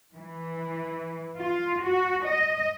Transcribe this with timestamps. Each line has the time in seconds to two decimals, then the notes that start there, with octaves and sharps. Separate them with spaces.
0.15 E3
1.37 F4
1.83 F#4
2.25 D#5